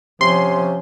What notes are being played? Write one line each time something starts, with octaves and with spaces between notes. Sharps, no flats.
C3 F3 C#4 C6